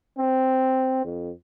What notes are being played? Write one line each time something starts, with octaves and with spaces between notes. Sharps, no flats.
C4
F2